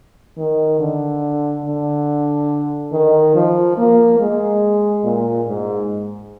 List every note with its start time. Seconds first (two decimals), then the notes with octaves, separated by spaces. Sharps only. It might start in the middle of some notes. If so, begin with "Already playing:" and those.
0.38 D#3
0.80 D3
1.65 D3
2.92 D#3
3.35 F3
3.77 A#3
4.19 G#3
5.04 A#2
5.47 G#2